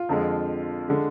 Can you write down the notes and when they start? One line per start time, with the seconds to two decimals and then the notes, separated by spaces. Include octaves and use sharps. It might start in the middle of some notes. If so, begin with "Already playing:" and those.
Already playing: F4
0.09 F2 D3 F3 G#3
0.88 D3 G#3